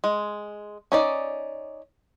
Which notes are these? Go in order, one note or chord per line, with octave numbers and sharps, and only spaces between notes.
G#3
C#4 D#4 D5